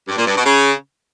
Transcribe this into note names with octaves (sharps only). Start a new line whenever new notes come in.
G2
A#2
G2
B2
C#3